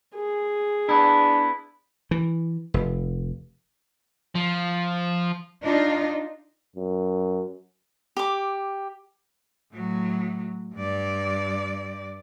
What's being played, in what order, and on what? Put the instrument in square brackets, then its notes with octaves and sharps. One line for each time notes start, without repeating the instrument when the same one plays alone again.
[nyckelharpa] G#4
[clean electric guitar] B3 E4 [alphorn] D4
[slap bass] E3
F1
[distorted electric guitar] F3
[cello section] D4 D#4 F4
[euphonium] F#2
[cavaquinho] G4 D6
[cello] A2 F#3
G2 D5